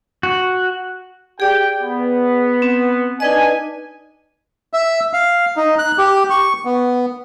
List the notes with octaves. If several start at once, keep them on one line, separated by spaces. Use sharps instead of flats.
F#4
G4 G#4 D5 G5
B3
C4
D4 D#4 B4 D#5 G#5
E5
F5
D#4
F#6
G4
C#6
B3